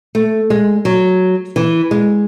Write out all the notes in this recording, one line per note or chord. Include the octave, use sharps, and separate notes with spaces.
A3
G#3
F#3
E3
G#3